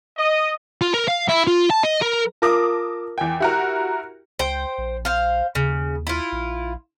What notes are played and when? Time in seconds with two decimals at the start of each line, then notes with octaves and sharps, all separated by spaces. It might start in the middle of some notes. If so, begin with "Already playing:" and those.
0.17 D#5
0.81 F4
0.94 A#4
1.08 F5
1.29 E4
1.47 F4
1.70 A5
1.83 D#5
2.02 A#4
2.42 F4 A#4 A5 D6 D#6
3.18 E2 G5 G#5
3.40 E4 F#4 G4 A#4
4.39 C#2 C5 G5
4.78 A#1
5.05 C5 F5
5.55 D#2 C#3
6.07 E4 F4
6.32 A#1